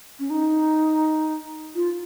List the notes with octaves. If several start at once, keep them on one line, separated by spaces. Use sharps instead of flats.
C#4
D#4
F4